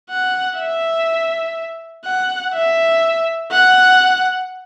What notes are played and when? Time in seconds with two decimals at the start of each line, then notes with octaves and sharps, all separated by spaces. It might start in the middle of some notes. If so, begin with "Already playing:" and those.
0.10 F#5
0.59 E5
2.05 F#5
2.54 E5
3.52 F#5